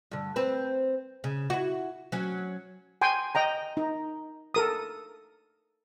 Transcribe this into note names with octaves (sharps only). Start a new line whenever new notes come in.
G2 D3
C4 B4
C#3
E4 F#4
F#3 C#4
G5 G#5 C6
D#5 G5 A#5
D#4
A4 A#4 D#6